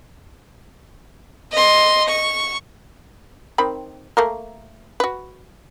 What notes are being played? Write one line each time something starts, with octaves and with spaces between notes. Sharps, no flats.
D#5 C6
C#6
D#3 C4 B5
A3 A#3 A#4
F#4 B4